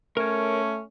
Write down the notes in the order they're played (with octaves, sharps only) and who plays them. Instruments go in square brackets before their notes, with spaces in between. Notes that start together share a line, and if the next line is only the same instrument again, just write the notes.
[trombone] A3 [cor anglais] C#4 [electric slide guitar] A#4 C#5